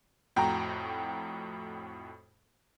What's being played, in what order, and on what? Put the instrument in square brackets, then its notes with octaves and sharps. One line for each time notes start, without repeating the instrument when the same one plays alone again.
[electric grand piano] F2 A2 F#4 [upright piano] G5 A#5